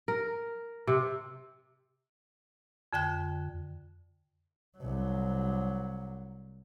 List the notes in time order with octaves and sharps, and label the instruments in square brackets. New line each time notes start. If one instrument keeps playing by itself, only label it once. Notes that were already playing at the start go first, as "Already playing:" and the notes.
[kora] A#4
C3
[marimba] F2 D3 G5 F#6
[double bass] C2 F#3